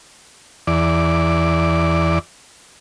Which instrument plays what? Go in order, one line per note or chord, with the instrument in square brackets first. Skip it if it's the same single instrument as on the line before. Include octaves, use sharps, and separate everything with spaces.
[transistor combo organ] E2 D5